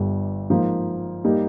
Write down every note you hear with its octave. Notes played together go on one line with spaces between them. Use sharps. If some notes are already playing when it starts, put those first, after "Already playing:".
Already playing: G1 G2 G3
G#2 F3 A#3
G3 A#3 D#4 G4